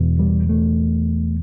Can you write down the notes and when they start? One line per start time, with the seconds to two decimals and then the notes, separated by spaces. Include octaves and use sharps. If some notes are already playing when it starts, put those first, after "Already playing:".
Already playing: E2 B2
0.19 G3
0.49 A3